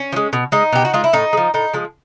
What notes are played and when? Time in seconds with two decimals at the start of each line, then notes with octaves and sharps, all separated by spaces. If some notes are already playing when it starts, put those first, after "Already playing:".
Already playing: C#4
0.12 F3
0.16 G#3
0.33 B2
0.52 G#3 D#4
0.73 B2 G4
0.85 F#4
0.94 G#3 F4
1.04 E4
1.13 A2 D#4
1.33 G#3
1.37 F3
1.54 A2 D#4
1.73 F3 G#3